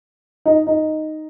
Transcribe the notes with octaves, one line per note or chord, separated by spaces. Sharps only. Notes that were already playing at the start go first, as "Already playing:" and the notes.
D#4
D#4